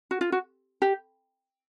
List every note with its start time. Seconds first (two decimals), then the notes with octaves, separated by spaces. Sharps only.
0.11 F#4
0.21 F4
0.32 F#4
0.82 G4